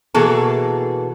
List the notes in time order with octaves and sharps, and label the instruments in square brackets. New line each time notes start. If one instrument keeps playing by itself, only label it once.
[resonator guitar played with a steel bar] B2 E3 A#3 G#4 A4